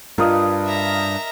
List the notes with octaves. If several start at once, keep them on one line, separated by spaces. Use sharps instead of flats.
G2 F4 A#4 D#5
E5 A#5